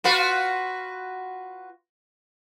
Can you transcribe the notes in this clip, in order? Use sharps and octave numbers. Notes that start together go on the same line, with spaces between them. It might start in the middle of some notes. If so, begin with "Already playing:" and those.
F4 F#4 B4